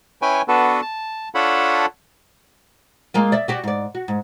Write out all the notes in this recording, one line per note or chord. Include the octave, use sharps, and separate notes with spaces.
C#4 E4 B4 C#5 G5 G#5
B3 D4 F#4 A4 B4
A5
D4 F4 A4 C#5 F#5 B5
G#3 A#3 F4
D5 E5
F#4 G4 D5
G#2 D5
F#4
G#2